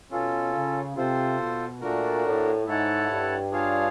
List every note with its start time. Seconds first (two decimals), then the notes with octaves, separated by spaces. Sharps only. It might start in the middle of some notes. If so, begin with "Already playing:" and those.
0.11 B2 C#4 F4 A4
0.53 C#3
0.95 C3 F4 A4 C5
1.38 B2
1.81 A#2 A3 D4 F#4 A#4
2.24 A2
2.66 G#2 E4 A4 C#5 F#5 A5
3.09 G2
3.51 D4 F4 G#4 C#5 F5